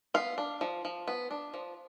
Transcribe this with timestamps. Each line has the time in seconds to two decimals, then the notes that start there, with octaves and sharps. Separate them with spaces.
0.14 B3 F5
0.38 D4
0.61 F3
0.85 F3
1.08 B3
1.31 D4
1.54 F3